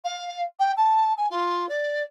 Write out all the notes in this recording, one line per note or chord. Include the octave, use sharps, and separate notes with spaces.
F5
G5
A5
G#5
F4
D5